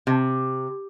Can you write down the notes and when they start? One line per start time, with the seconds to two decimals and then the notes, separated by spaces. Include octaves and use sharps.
0.07 C3